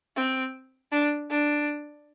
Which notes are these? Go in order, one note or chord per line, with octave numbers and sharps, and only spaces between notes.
C4
D4
D4